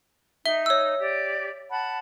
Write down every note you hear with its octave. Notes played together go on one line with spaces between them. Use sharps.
D#4 E5 G7
C#5 E6
G4 D5
F#5 A5 B5